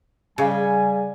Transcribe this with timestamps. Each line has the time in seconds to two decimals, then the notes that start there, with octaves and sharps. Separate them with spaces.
0.38 C#3 G3 G#4 D#5 F5 G#5